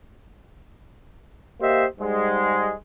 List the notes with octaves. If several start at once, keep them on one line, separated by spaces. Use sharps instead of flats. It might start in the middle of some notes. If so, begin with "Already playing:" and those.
A#3 G4 C5 D#5 E5
G#2 G3 G#3